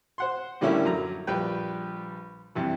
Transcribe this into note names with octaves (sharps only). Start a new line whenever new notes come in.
C5 F#5 C6
A2 D3 G3 A#3 C#4 E4
F#2 F#3 A#5
A#1 G3 B4 G5
G2 C3 E3